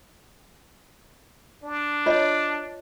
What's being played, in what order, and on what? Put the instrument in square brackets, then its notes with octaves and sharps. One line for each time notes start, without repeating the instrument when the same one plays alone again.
[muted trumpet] D4
[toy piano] F4 C#5 D#5